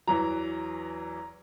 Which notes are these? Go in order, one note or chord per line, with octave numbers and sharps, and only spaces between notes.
E2 E3 F#3 A#5